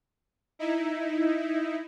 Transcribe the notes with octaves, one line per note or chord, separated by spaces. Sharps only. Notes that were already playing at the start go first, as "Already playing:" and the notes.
D#4 E4